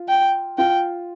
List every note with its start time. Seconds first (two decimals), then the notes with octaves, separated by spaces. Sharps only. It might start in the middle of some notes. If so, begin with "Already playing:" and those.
Already playing: F4
0.09 G5
0.58 F4 G5